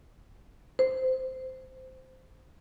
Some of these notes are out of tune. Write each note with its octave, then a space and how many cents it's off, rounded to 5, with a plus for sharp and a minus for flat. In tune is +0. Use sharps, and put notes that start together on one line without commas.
C5 -10